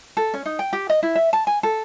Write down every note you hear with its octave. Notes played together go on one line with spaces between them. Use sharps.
A4
C#4
D#4
G5
G4
D#5
E4
E5
A5
G#5
A4